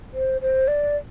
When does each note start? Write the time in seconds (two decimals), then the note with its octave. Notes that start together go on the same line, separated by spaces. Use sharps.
0.14 C5
0.42 C5
0.68 D5